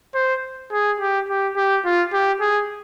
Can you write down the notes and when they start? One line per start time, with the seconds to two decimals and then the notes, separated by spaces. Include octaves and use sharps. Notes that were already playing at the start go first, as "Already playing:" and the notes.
0.15 C5
0.72 G#4
1.00 G4
1.29 G4
1.57 G4
1.85 F4
2.13 G4
2.41 G#4